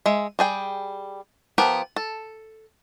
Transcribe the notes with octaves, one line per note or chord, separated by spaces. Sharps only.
G#3 E5
G3 G#4 G5
F3 B3 G4 A#4
A4